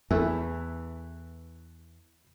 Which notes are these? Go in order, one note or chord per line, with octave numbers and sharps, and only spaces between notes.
E2 E3 A3